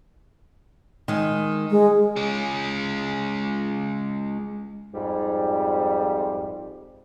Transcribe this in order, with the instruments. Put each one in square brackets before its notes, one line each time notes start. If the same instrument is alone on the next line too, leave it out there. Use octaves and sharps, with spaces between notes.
[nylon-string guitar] D#3 G#3
[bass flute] G#3
[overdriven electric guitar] G#3 C#4
[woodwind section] F2 G#2 G3